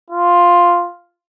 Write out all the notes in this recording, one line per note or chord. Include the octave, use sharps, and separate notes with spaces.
F4